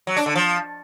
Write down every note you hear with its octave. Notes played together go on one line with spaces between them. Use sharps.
F#3
D4
D3
F3